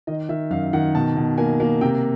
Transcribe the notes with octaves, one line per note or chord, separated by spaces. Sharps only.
D#3 D#5
D#3 E5
F#2 F5
D#3 F#5
B2 A5
B2
A#3 G#5
A#3
C3 G5